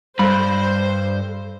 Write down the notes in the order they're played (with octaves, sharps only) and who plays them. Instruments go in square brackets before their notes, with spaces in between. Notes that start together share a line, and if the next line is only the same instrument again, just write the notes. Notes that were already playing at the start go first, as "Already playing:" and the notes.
[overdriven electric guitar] G2 [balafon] G3 [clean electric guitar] A4 B5 [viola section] C5